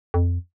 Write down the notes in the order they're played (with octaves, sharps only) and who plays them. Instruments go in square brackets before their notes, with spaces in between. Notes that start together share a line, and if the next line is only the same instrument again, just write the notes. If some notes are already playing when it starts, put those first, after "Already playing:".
[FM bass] F2